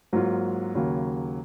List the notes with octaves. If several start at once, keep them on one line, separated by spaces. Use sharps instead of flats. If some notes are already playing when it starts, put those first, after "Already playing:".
G#2 F#3 A#3 F4
D#2 C#3 F#3 A#3